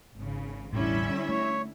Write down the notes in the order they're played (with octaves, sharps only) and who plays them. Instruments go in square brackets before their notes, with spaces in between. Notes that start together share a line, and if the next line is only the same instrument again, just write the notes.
[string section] G#1 C#3
[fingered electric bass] E1 A1 A2 [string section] D3 E4 E5 [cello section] G3 C#4
[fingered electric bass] A3 [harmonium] C#5